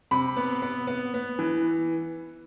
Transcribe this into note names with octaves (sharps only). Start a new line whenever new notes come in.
C3 B5
B3
B3
B3
B3
E3